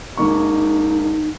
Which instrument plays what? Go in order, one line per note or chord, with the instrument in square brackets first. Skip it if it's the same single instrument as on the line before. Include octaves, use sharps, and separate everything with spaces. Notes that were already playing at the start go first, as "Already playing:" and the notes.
[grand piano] E1 A#3 C#6 [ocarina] D#4